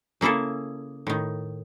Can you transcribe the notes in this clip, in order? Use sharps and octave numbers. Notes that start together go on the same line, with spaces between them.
C#3 A#3 E4 G#4 A4
A2 D#3